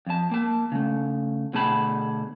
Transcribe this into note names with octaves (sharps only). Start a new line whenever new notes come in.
F2 A5
A#3 A5
C#3 A3
B2 D3 A3 G#4 A5 B5